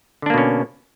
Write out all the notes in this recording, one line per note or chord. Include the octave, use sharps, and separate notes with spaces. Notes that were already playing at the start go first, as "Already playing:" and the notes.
B2 D3 A#3 C#4 D4